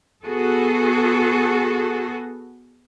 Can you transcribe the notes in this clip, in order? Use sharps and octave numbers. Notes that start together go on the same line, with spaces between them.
B3 F#4 G#4 A4